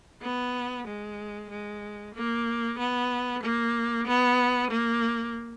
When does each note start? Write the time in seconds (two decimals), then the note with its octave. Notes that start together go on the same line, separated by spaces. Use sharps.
0.22 B3
0.87 G#3
1.50 G#3
2.15 A#3
2.78 B3
3.43 A#3
4.07 B3
4.71 A#3